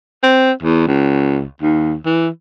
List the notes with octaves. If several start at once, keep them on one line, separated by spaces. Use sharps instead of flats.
C4
E2
C#2
D#2
E3